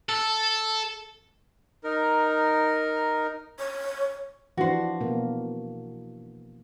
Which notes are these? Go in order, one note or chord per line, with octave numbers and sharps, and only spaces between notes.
A4
D#4 A#4
C#5
E3 F3 D4 F#4 C5
B2 A#3